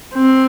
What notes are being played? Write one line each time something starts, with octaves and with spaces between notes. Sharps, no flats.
C4